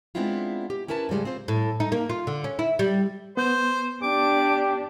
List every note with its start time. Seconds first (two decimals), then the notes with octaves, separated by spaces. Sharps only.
0.15 G#3 B3 C4 D4 E4 F4
0.70 G4
0.88 C#4 E4 A#4 B4 A5
1.09 G#2 C#3 G3 G#3
1.25 C4 F4 C5
1.48 A2
1.80 D#4
1.92 A#3
2.09 F4
2.27 D3
2.44 C#4
2.59 E4
2.79 G3
3.37 B3 C5 G6
4.02 D4 G4 D6